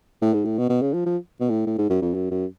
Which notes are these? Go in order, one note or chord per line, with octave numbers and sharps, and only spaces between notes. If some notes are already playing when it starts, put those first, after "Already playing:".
A2
G#2
A2
B2
B2
C#3
F3
F3
B2
A2
A2
G#2
F#2
F2
F#2
F#2